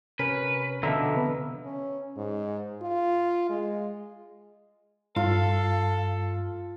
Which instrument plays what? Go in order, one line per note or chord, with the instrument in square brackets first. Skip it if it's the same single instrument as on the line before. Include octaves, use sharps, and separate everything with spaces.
[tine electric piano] C3 C#4 A#4 [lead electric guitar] B4
[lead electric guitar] B2 F3 [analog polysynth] D3 [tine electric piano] E5 A#5 [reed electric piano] E6
[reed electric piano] C3 B3 B4
[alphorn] C#4
G#2
F4
G#3
[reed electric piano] G2 [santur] F4 [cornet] A4 [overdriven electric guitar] F5